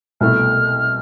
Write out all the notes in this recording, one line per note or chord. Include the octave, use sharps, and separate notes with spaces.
C2 B2 A3 E4 F6